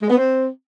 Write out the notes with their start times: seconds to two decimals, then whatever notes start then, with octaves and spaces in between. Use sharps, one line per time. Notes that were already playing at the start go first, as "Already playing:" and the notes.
0.01 G#3
0.09 B3
0.17 C4